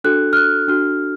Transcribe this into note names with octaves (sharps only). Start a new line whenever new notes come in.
D4 F#4 A4 F#6
F6
F#6
D4 F#4 A4 F6